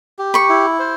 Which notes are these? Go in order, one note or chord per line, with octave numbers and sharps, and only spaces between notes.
G4
B5 C#6
E4
C5